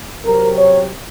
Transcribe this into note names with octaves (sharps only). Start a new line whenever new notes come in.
C3 F#3 C4 A#4
C#5